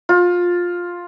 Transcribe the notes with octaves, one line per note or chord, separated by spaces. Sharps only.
F4